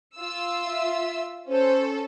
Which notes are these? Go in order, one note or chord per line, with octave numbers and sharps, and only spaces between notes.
F4 E6
E5
C#4 A4 C5